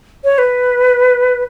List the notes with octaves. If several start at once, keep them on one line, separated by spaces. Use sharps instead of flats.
C#5
B4